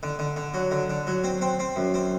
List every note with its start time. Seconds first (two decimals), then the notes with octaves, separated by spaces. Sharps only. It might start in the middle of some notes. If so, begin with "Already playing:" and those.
0.03 D3
0.19 D3
0.37 D3
0.54 F#3
0.71 D3
0.90 D3
1.07 F#3
1.24 C4
1.41 C4
1.59 C4
1.76 F#2
1.94 C4